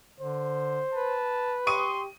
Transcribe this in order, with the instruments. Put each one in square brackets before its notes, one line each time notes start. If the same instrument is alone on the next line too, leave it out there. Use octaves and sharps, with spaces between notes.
[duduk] D3 [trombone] C5
[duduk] B4 [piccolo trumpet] A5
[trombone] G4 [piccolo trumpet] C6 [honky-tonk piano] C#6 D#6 D#7